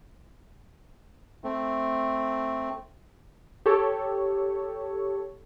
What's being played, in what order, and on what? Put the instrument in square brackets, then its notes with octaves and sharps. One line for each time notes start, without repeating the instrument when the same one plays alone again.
[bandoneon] A3 C4
[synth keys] G4 A4 C#5